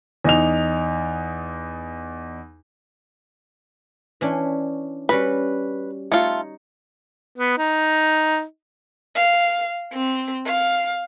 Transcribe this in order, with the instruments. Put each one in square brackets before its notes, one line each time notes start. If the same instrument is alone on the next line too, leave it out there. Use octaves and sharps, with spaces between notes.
[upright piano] E2 D#4 F7
[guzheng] E3 C#4 D4
[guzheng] G3 C#4 F#4 [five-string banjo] B4
[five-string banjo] A3 F4 [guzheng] D#4 C#5
[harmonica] B3
D#4
[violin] F5
C4
F5